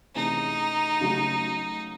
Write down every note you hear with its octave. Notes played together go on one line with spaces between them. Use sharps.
C3 E3 A3 C#4 D#4 G#4
C#3 F#3 A3 C#4 F#4